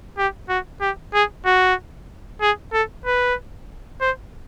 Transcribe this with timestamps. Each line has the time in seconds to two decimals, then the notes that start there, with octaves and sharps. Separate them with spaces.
0.18 G4
0.49 F#4
0.81 G4
1.14 G#4
1.45 F#4
2.41 G#4
2.73 A4
3.06 B4
4.01 C5